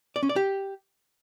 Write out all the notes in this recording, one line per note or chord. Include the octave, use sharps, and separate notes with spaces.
D5
C#4
D5
G4